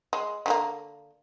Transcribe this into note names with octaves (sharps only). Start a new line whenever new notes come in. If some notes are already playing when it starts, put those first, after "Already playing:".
G#3
D3 G#3 A#3